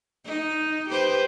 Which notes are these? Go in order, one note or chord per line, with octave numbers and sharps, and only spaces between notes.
D#4
G4 B4 C5